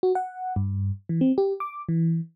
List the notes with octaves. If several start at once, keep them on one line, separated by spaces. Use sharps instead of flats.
F#4
F#5
G2
E3
C4
G4
D6
E3